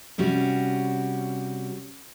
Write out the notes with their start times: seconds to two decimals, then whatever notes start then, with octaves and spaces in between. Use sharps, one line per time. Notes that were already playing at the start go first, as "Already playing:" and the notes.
0.18 C3 G3 C#4 F#4